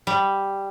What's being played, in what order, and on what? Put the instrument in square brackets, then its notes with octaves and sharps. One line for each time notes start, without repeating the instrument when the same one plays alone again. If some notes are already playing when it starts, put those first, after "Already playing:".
[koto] G3